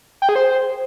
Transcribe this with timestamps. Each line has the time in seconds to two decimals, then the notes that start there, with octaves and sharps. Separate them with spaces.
0.22 G5
0.29 G#4
0.36 C5